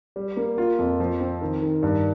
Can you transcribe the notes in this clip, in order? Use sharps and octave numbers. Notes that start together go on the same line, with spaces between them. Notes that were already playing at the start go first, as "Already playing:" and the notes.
G3
A#3
F4
F2
F3
C4
D#3
D#3
G2